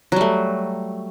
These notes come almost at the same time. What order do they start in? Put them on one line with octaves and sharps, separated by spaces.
F#3 G3 A3